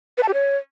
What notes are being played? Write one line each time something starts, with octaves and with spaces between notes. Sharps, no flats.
B4
A5
G4
C#5